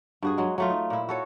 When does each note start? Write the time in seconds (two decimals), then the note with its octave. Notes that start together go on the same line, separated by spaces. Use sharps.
0.22 G2 F#4 G#4
0.38 F#3 G#3
0.58 F#3 A3 F4
0.70 D#4
0.90 A#2 E4
1.09 F#4 A4 C#5